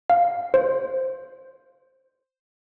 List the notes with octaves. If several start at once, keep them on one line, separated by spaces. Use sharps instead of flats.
F5
C5